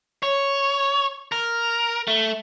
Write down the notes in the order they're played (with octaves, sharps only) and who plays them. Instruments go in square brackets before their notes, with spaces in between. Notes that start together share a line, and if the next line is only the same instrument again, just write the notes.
[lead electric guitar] C#5
A#4
A3